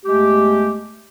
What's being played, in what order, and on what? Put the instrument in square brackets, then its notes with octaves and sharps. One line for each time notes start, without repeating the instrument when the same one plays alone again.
[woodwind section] E2 G#3 A3 G4